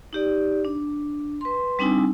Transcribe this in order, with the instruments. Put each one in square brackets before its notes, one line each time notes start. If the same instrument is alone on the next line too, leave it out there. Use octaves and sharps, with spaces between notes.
[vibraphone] D#4 G4 D5
D4
B4 C6
G3 C4 D4 D#4 G#5 E6